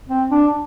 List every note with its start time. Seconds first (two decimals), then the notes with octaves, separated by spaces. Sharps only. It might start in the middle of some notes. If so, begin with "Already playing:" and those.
0.09 C4
0.31 D4